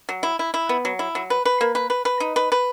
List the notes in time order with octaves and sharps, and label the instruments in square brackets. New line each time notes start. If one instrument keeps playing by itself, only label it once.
[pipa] F#3
E4
E4
E4
B3
F#3
E4
F#3
B4
B4
A#3
B4
B4
B4
D#4
B4
B4